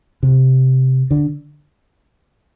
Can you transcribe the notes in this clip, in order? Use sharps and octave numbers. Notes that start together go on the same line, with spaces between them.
C3
D3